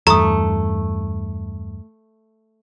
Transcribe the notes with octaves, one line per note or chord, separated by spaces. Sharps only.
E2 G2 A3 A#5 D#6